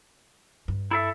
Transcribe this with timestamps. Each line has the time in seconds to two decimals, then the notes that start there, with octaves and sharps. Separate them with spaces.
0.68 G2
0.91 E4 A4 E5